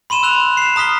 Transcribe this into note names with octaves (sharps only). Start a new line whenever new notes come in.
B5 C6 D#7 E7
E6 F#6 F7
C7 E7
A#5 D#6 F6 B6 G7